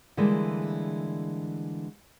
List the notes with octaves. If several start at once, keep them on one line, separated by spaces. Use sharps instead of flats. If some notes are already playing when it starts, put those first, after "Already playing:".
D3 E3 G3 G#3 A#3